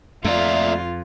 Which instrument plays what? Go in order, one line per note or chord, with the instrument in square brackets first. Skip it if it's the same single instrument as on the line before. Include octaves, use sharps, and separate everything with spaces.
[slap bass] F2 [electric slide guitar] A3 A#3 D5 [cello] F4 [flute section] E5